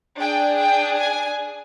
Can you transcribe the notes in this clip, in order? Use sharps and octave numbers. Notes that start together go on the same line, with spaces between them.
D4 G#4 G5
G5
G#5